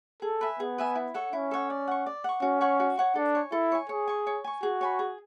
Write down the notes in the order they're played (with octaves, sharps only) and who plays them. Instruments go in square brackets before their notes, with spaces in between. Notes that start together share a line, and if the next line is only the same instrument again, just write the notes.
[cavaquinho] G#4 [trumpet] A4
[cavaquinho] B4 E5 G#5
[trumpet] B3 [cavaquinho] G#4
[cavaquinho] B4 E5 G#5
E4
A4 C#5 F#5
[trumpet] C#4 [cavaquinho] E4
[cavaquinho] A4 C#5 F#5
D5
F#5 C#6
D5
F#5 C#6
[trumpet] C#4 [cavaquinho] F#4
[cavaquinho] C#5 F#5 C#6
F#4
C#5 F#5 C#6
[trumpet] D4 [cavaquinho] A4
[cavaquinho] C#5 G#5
[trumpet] E4 [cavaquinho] A4
[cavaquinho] C#5 G#5
[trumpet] G#4 [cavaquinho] C#5
[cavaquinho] G#5 C#6
C#5
G#5 C#6
[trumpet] F#4 [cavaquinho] G#4
[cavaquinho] C#5 G#5 B5
G#4